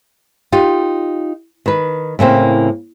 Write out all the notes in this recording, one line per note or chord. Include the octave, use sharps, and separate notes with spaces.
D#4 F4 G4
D#3 B4
A2 C#3 A#3 C4